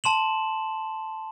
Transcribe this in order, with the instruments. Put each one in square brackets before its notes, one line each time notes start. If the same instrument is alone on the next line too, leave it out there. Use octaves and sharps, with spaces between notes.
[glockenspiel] A5 C6 E7 F#7